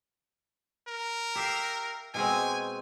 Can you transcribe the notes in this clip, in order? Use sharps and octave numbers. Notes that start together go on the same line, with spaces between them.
A#4
G4 E5 F5
B2 G#3 C4 G#5